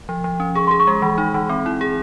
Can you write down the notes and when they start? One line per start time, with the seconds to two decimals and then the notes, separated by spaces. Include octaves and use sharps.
0.09 F3
0.24 F3
0.40 C#4
0.55 G#4 C#6
0.67 C6
0.71 G#4
0.80 C#6
0.87 G#3
1.02 E3 B5
1.18 D#4
1.34 E3
1.49 C4
1.66 E4
1.81 G#4